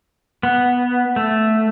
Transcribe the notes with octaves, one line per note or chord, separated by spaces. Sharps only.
B3
A3